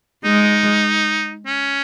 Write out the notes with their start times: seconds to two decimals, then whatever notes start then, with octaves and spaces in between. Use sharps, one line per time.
0.25 G#3 D#4
1.46 C#4